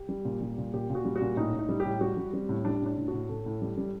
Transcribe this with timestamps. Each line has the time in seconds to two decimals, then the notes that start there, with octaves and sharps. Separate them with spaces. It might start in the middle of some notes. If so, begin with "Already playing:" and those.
Already playing: G4
0.09 G3
0.25 A#2
0.41 G3
0.58 A#2
0.73 A#2 G4
0.90 A#2
0.95 F#4
1.05 G3
1.16 F#4
1.21 A#2
1.37 A2 D#4
1.54 A2
1.59 D#4
1.69 G3
1.80 G4
1.85 A2
2.01 G3 F#4
2.17 G3
2.33 G3 C4
2.49 A2
2.65 G3 D4
2.82 A2 D4
2.98 A2
3.08 F#4
3.13 A2
3.29 A2 A4
3.46 A2
3.62 G3
3.78 G3